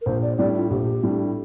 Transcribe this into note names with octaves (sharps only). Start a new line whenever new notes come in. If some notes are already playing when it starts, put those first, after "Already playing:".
A#4
A#1 C5
D5
A2 G3 D4 D5
F4
A#1 G4
A2 G3 D4